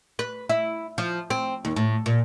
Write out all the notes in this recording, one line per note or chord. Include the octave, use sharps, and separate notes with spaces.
B4
E4
F3
C4
D#2
A2
A#2